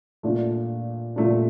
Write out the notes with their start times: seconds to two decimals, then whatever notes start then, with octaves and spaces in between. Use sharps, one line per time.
0.23 A#2 A3 D4
1.16 A#2 A3 D4